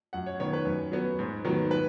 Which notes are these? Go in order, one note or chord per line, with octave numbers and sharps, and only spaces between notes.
F#2 F#5
C#5
D#3 B3 C#5
B4
F#2
F#3 B3
G#2
D#3 F#3 B3
B4